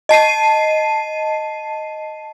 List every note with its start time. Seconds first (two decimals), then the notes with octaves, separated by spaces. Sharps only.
0.09 D#5 A5 C7 D#7